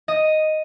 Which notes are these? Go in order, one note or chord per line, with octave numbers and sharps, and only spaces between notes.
D#5